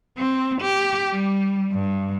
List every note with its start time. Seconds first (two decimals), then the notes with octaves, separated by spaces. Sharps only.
0.18 C4
0.62 G4
1.12 G3
1.73 G2